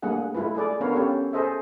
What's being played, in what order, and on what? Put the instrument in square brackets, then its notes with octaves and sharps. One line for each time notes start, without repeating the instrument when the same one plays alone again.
[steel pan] G3 A3 A#3 D4 G#4 F#5
G#3 A3 E4 F4 B4
G#4 A4 D5
B3 D4 A#4 B4 C#5 F5
C#4 G4 A4 C#5
G#4 A4 C5 D#5 E5